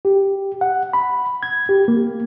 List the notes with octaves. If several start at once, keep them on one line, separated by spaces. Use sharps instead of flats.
G4
F#5
B5
G#6
G4
A#3